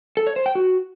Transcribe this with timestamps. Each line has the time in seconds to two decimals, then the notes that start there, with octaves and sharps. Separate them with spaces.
0.17 A4
0.27 C#5
0.36 C5
0.46 G5
0.55 F#4